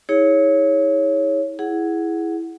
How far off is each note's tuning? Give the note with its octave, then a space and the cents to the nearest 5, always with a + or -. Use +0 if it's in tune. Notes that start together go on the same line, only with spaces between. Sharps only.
E4 -45 G#4 -10 C#5 +0
E4 +0 G#4 +0 F#5 +0